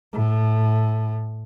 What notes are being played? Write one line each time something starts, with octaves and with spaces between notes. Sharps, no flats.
A2